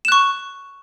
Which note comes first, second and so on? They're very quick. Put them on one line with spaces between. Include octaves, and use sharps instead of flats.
E7 F#6 C#6